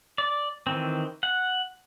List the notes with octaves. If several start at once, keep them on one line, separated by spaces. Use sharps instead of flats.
D5
D#3 E3 C4
F#5